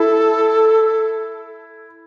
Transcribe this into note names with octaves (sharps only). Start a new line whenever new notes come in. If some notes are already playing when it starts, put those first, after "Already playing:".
Already playing: E4 A4